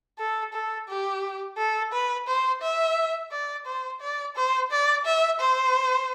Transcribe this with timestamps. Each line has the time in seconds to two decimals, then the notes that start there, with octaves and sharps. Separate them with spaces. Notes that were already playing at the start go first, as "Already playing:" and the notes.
0.19 A4
0.53 A4
0.88 G4
1.57 A4
1.92 B4
2.27 C5
2.62 E5
3.31 D5
3.66 C5
4.00 D5
4.35 C5
4.71 D5
5.05 E5
5.40 C5